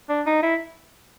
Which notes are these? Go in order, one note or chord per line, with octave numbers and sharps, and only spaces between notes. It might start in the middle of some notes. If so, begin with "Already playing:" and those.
D4
D#4
E4